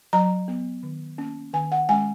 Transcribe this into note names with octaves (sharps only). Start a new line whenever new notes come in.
F#3 A#5
B3
D#3
A#3 C#4
D#3 G#5
F#5
G#3 C#4 G#5